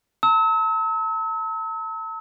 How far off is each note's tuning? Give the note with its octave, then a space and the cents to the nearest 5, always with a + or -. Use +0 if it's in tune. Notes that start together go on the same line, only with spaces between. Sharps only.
A5 +40 E6 -40